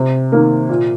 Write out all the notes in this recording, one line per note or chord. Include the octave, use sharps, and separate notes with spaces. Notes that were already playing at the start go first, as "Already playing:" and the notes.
Already playing: C3
D#3 A#3
A#2